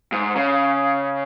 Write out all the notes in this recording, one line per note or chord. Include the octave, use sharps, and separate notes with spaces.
G#2
C#3